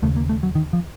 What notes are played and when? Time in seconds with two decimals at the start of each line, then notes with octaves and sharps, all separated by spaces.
0.02 D#2 C#3 A3
0.16 A#3
0.29 A3
0.43 F#3
0.55 D#3
0.73 F3